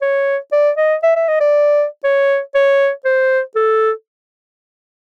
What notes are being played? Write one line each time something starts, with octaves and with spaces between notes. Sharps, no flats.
C#5
D5
D#5
E5
E5
D#5
D5
C#5
C#5
C5
A4